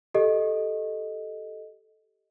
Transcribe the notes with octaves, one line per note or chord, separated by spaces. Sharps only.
G4 A4 D#5